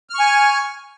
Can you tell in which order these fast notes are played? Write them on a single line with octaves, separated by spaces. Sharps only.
F6 C#6 G#5